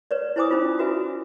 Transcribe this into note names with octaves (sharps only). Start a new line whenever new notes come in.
B4 C#5 D5
E4 B4 C5 G#5 D6 D#6
C#4 D#4 F4
F#4 B4 E5 G#5